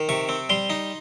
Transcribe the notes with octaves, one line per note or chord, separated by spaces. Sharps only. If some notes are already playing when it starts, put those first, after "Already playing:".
Already playing: D#3
C3 C#6
C4
G3 C6
D#4